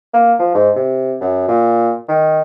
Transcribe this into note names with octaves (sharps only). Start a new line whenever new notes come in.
A#3
F3
G#2
C3
F#2
A#2
D#3